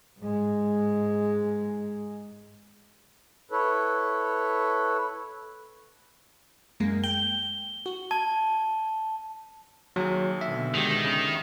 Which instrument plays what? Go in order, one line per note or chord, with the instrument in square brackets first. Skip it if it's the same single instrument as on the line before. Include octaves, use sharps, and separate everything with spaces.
[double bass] G#2 G#3
[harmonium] E4 A4 B4 C#5
[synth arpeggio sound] F#2 G#3 A#3
[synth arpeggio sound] G5 [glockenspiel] G7
[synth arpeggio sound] F#4
[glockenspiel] A5 [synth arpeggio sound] G#6
[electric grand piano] D#2 G#4 [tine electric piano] F#3
[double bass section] B2 D3 [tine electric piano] E5
[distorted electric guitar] D#3 [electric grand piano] G#3 B3 G4
[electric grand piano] C#3